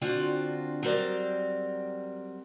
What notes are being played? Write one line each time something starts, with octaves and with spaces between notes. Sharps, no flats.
D3 C4 D4 F4 F#4 F#5
F#3 G3 C4 A#4 D5